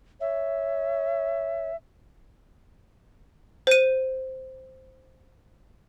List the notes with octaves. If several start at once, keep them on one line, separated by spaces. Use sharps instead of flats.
C#5 E5
C5 D#7